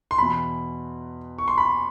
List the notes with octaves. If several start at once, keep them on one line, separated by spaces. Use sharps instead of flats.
C6
E2 B2 B5
C#6
C6
B5